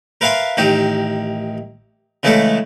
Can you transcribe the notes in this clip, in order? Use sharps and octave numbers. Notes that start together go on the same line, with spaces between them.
A#4 B4 E5 F5 G#5 C6
A1 D#3 D#4 G4
C#3 E3 G#3 A3 E4 A4